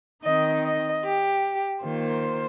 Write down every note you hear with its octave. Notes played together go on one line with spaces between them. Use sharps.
D#3 C4 D#4 D#5
D#5
G4
D#3 A#3 F4 C5